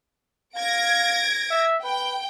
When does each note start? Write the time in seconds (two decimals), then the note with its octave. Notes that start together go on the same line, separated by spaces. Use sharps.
0.55 F5 G#6 A#6 D7
1.51 E5
1.84 B4 G5